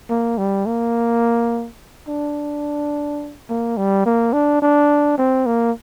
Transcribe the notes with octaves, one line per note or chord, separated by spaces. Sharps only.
A#3
G3
A#3
D4
A#3
G3
A#3
D4
D4
C4
A#3